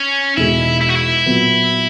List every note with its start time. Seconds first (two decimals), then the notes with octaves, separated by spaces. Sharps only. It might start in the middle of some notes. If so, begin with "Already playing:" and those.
Already playing: C#4
0.37 E2 B2 G#3 D#4 E4
0.81 E4
0.89 F#4
0.95 E4
1.26 A#2 F#3 B3